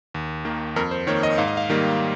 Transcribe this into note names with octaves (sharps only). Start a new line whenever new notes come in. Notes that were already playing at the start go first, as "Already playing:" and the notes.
D#2
D#3 A#3
F2 A#4
C5
D#3 A#3 C#5
D#5
G#2 F5
D#5
F5
D#3 G3 A#3